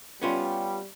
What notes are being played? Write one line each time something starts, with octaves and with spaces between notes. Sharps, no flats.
G3 B3 C#4 F4